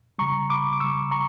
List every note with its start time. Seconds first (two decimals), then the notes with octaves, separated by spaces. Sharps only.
0.18 C#3 G3 A#5 C#6
0.49 B5 D6
0.73 D6
0.80 C#3 G3 C#6 E6
1.11 A#5 C#6